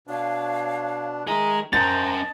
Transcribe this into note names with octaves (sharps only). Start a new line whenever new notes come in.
B2 D4 C#5 F5
D#3 G#4 D#5 E5 A#5
C#4 A#4 C5 D#5 G5 A5 A#5 A6